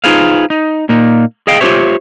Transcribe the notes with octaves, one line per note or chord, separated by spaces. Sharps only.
D#4 F4 G#4 B4 C5 F5
D#4
A#2 A#3 D#4
G#4 D#5 F5 G5
F4 G4 A4 C5 C#5 E5